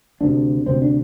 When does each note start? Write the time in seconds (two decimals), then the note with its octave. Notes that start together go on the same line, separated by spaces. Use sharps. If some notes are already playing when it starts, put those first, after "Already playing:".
0.21 D2 C3 D4
0.66 D2 C3 C4
0.82 D4